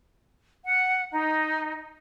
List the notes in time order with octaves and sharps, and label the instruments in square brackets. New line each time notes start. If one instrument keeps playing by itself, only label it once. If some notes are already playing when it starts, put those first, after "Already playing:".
[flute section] F#5
D#4